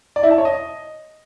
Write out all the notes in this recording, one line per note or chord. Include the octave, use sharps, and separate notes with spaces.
D5
E4
A5
C#5
D#5